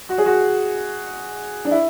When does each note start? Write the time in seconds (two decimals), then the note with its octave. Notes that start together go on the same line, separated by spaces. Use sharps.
0.09 F#4
0.18 G#4
0.26 F#4
1.65 D4
1.71 E4